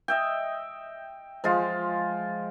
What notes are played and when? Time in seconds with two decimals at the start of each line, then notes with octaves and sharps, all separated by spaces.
0.08 D#5 E5 G5
1.44 F3 G#3 F4